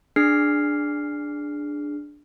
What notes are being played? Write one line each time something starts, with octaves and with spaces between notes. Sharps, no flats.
D4 G#4 F6 C7